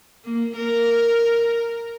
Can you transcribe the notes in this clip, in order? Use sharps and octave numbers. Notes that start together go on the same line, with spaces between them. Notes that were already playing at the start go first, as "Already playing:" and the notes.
A#3
A#4